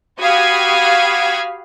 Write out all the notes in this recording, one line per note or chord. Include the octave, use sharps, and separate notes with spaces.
F#4 G4 F5 B5 D#6 G#6